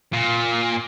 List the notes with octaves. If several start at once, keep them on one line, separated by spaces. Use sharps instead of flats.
A#2